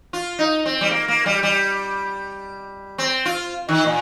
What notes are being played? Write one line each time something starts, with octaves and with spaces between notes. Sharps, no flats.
F4
D#4
C4
G3
A#3
A#3
G3
G3
C4
F4
D#3
A#2